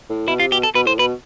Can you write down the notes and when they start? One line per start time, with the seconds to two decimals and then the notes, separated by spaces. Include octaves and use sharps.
0.10 A2
0.28 B2 E4
0.40 C3 F4
0.52 B2 G4
0.63 A4
0.75 B2 B4
0.87 A2 C5
0.99 B2 B4